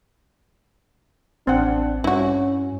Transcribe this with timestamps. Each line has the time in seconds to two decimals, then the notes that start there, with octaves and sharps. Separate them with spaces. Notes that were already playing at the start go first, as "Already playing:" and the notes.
1.47 A1 C4 D4 F#5
2.04 G2 C#4 E4 F#4